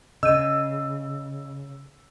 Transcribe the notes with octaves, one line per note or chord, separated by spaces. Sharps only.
C#3 D#5 E6 G6 D#7